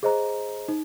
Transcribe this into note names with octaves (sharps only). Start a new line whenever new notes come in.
G#4 C5 D#5 A#5
D#4